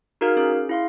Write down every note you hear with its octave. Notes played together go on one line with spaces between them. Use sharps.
D#4 F#4 G#4 A#4 F5 F6
C#4 G#4
G#4
E4 F5 C6